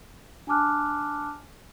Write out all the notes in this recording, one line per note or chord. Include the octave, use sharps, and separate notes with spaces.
D4 G#5 A5 D6 F6 F#6